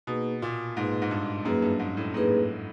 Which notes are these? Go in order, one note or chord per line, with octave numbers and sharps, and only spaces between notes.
B2 A#3 D#4 G#4 B4
A#2
G#2 A#3 D#4 G#4 B4
G#2
G2
F#2 A#3 D#4 G#4 B4
G2
G#2
A2
A2 A#3 D#4 G#4 B4